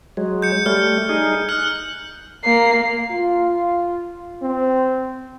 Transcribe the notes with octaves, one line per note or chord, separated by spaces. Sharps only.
F#3 G#3
G6 C#7
G3 A3 F6
D#4 G#4
F6 F#6
A#3 C7
F4
C4